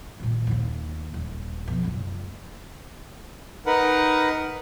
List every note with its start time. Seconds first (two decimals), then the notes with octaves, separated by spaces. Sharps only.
0.20 A#2 D#3
0.47 D#2 A#3
1.14 D#1
1.68 F2 B2
1.83 F#1 C#2
3.66 D#4 A#4 B4 F#5